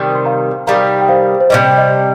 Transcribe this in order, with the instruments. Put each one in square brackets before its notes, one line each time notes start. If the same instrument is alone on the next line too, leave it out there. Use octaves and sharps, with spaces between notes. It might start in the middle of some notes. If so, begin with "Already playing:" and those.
Already playing: [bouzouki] C3 D#3 G3
[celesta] C6
F5 A#5
[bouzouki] C3 D#3 G3 [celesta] F5 A#5
[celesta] G5
C5 F5
C5
[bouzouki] C3 D#3 G3 [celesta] D#5
[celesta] D#5